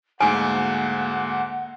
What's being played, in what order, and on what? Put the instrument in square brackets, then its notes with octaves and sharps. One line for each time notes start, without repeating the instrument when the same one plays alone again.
[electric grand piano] D2 G#2 [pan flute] A#3 [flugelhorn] F#5 [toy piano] G#5